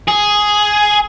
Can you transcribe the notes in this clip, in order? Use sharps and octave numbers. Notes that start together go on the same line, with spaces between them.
G#4